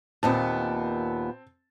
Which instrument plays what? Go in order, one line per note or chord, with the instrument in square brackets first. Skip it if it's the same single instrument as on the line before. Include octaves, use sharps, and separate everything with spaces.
[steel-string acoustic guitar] D#2 A#2 B3 [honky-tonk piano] C4 A5